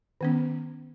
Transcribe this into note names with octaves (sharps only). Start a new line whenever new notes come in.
D#3 B3 C#4